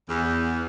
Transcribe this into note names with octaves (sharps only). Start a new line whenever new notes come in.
E2